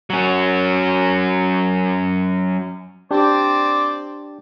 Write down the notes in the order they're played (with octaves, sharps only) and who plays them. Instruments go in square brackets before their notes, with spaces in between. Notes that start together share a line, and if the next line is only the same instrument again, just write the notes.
[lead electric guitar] F#3 C#4
[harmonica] C4 C5 D5 [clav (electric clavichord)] D4 G4